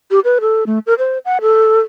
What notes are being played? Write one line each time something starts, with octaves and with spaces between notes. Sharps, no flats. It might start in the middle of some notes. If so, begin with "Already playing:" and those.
G4
B4
A4
A3
A#4
C5
F#5
A4